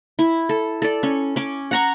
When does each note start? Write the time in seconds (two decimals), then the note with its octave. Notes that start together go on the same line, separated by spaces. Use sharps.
0.19 E4
0.49 A4
0.82 A4 D5
1.03 C#4
1.36 C#4 D6
1.71 F#5 A#5 C#6